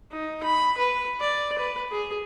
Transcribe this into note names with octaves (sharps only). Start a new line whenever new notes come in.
D#4
B5
B4
D5
B4
G#4